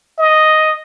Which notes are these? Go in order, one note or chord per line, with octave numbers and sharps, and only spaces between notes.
D#5